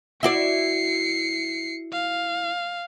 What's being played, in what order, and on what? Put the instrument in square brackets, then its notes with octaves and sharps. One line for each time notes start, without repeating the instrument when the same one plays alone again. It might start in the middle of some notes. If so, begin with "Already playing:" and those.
[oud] E4 F#4 D5 [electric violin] C7 C#7
[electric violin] F5